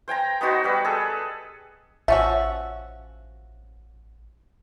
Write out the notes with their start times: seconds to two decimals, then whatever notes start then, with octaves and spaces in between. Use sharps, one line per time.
0.08 C5 G5 G#5 A#5
0.41 B3 D#4 F#4 C5
0.64 G3 B4
0.85 G#4 A4
2.08 A1 F3 C#4 F#4 E5